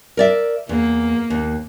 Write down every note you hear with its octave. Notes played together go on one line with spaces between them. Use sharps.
A#4 D5 E5
E2 A#3
D#2